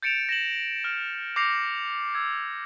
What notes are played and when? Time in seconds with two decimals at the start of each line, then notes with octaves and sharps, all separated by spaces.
0.02 G6 A6 C#7 D7 E7 F7
0.29 A#6 E7 F#7
0.84 F6
1.36 D6 G6 A#6 C7 C#7 F7
2.15 E6 G#6